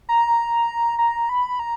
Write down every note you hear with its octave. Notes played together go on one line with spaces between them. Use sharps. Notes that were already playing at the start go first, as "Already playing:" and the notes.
A#5
A#5
B5
A#5